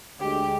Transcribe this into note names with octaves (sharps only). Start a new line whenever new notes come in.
D2 D3 G#3 G4